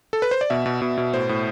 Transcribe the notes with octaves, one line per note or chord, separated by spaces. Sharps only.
A4
B4
C5
D5
B2 E5
B2
B2
B2
A2 C5
A2